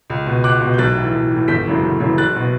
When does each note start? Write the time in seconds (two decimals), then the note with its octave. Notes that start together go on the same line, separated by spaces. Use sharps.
0.10 C#2
0.26 B2
0.44 C#2 D6 F#6
0.61 B2
0.74 G6
0.78 B1 F#6 A6
0.96 A2 E3
1.13 B1
1.31 A2 E3
1.48 G1 G6 B6
1.66 F#2 C#3 E3
1.83 G1
2.00 F#2 C#3 E3
2.18 F#1 F#6 A6
2.36 B2